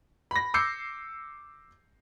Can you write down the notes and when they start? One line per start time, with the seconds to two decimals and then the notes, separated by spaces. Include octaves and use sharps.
0.31 B5 A#6
0.54 D6 E6 G6 C7 C#7